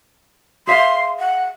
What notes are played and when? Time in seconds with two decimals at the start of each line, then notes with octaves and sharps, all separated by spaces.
0.67 G#4 E5 F5 C6
1.19 F#5